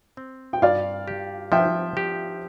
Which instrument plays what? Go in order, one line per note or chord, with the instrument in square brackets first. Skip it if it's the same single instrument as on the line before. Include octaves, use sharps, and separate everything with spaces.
[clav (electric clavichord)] C4
[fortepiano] G5
[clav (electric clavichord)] G2 [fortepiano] D5 F5
[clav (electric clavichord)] G4
[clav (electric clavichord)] F3 [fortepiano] E5 G5
[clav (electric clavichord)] G4